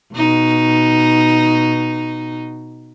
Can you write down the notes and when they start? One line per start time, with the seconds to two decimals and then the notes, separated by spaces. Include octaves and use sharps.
0.14 B2 D#4